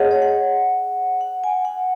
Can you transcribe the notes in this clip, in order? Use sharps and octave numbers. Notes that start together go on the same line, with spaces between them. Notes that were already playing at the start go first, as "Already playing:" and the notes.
Already playing: G#4 C#5 D#5 F#5
C#5
F#5
F#5
G#5
F#5